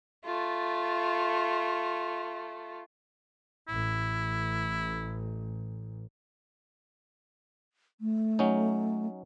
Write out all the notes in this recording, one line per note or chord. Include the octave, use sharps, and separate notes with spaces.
A3 F4
A1 E4
A3
F#3 C#4 D#4